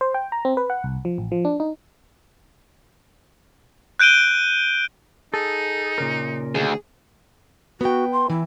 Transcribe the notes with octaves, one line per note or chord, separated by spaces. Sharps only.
C5
G5
A#5
C4
B4
F#5
C2
F3
A1
F3
D4
D#4
F#6 G6 D7 D#7 G7
D#4 G#4 A4
A#2 C#3 A#4
D2 G#4
B3 F#4 G5
C6
E3 E4